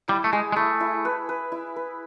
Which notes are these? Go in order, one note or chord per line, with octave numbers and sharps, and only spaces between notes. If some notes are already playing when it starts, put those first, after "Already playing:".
G3 E4
A3
G#3 G#4
G#3
A3 E4
E4
B4
B4
E4
B4